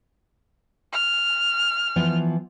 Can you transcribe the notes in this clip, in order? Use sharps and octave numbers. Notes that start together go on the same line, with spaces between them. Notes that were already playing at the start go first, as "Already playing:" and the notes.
F6
E3 F3 B3